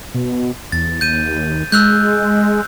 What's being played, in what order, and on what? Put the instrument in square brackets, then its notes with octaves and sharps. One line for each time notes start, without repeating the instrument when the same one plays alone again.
[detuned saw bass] B2
[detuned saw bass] E2 [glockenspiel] A6
[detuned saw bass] D#2 [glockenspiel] G6 D#7
[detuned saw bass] G#3 [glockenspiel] E6 F#6 G6